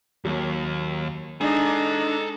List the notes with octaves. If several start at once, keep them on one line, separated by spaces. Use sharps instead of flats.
D#2 F#3 A#3
G#3 D4 D#4 A4 G#5